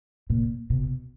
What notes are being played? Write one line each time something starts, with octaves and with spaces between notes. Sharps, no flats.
A#2
B2